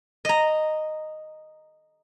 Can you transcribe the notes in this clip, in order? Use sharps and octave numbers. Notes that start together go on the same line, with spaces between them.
D#5 A#5